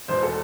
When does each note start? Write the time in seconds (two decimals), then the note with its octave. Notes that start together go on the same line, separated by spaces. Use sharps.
0.08 E1 E2 B2 B3 C5
0.23 A4